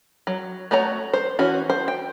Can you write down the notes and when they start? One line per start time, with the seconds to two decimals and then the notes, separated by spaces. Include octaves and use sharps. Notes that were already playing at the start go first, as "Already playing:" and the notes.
0.27 F#3
0.71 A3 F#4 C#5 A#5
1.13 C5
1.39 E3 C#4 F#4
1.70 C5
1.88 G5